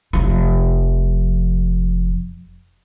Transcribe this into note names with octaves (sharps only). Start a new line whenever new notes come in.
F1 F3